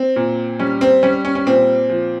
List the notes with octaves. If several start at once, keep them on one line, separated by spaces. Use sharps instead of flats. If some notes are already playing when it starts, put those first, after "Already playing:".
Already playing: C4
A#2
G3 C#4
C4
G3 C#4
C#4
C#4
A#2 C4
F3